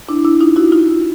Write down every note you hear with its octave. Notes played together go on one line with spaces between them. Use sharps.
D4 E4
D4 E4
D#4 F4
E4 F#4
D#4 F4